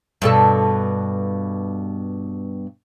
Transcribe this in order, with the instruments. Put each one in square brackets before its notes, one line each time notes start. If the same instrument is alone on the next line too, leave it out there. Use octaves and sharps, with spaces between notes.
[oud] G2 B2 A4